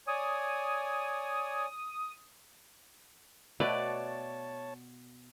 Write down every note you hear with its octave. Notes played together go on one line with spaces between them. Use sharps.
C#5 D5 G#5 D#6
B2 A3 B4 C#5 D5 A5